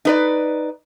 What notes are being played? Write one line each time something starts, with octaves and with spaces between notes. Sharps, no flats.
D#4 B4 D5